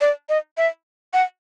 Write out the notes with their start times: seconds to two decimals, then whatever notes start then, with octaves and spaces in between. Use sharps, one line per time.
0.01 D5
0.29 D#5
0.57 E5
1.13 F#5